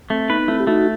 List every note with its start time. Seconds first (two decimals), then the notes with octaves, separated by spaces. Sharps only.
0.10 A3 C4
0.29 B3 D#4 B4
0.48 A3 C4 E4
0.60 G4
0.67 A3 D#4 F#4